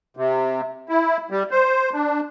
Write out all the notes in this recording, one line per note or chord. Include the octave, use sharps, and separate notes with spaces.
C3
E4
G3
C5
D4